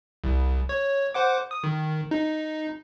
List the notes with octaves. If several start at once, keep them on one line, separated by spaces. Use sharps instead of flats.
C2
C#5
C5 F#5 D6
D#6
D#3
D#4